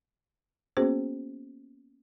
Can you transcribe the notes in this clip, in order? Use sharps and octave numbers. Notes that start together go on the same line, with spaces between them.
A#3 B3 C#4 F#4 G#4 C5